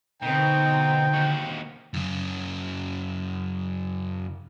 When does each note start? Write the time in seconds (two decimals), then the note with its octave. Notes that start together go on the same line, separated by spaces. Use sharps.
0.22 B2 D3 C4 D#4 G5
1.13 D#2 F#4
1.94 F#2 C#3